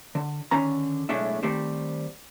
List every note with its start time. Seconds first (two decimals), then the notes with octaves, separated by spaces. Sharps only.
0.15 D3
0.51 D3 D#3 C#4 A#5
1.09 B1 A2 G#3 A3 D4 E5
1.43 D#3 G3 A3 C4 G4 C5